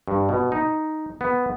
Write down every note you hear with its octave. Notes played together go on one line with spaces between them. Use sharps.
G2
B2
D#4
B3